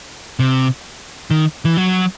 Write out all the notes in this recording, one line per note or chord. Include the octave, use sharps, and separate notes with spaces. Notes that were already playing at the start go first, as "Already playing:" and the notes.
C3
D#3
E3
F#3